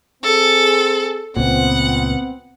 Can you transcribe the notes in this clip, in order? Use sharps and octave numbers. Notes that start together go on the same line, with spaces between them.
C4 G#4 A4
C#2 A#2 B3 C4 F#5